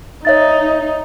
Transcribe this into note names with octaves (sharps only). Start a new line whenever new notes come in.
D#4 C#5 E5 A6